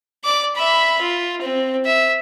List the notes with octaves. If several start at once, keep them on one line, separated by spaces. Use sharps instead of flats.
D5 D6
E5 B5
F4
C4
E5